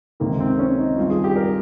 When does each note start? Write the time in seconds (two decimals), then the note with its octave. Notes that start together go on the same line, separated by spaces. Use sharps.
0.20 C#2 C3 D#3 A#3
0.40 C4
0.59 C#4
0.78 D#4
0.97 G2 D#3 F4
1.10 G#4
1.24 G4
1.36 A#4